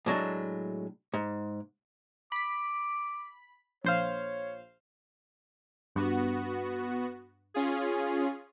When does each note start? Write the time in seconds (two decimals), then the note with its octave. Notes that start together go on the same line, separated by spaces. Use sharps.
0.06 A2 F#3 G#3 D4
1.13 G#2
2.32 B5 D6 B6
3.84 A#1 C5 C#5 F5
5.96 G2 B3 F#4
7.54 C#4 F4 G#4